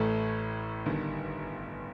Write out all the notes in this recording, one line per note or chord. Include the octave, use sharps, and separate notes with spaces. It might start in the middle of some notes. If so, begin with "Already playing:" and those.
Already playing: A1 A2 A3
G1 G2 D#3